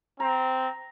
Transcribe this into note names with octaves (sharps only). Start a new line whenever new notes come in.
C4 A#5